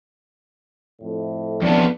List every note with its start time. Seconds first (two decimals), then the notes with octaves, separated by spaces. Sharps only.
1.01 F2 A2
1.62 F2 E3 B3 C#4 D4